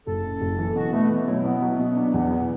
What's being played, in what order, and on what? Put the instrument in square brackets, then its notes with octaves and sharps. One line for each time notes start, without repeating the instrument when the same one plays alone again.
[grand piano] F#1 [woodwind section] A4
[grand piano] F#2
F#1
E3
[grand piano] B2 [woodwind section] F#4
[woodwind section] A3 [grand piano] B3
[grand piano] B2 [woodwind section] E3
[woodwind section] F#3 [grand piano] E4
[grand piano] B2 [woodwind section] B3
[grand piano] F#3
B2
D4
E2
E3